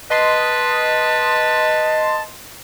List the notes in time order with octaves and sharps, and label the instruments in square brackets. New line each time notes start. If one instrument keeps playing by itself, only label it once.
[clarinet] B4 [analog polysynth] D#5 C6 [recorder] A5